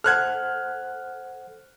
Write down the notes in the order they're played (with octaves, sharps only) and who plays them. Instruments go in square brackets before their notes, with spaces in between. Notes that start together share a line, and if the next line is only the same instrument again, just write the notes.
[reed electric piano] A4 C5 F#5 [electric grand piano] F6 F#6 G#6